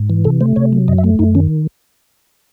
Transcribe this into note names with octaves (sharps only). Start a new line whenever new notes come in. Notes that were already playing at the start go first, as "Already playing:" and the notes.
Already playing: G#2
E3
C3 A4
A3 C5
C3 C#5
F#3
F#2 D#5
E5
A3
F#2 D#4
D#3 C#4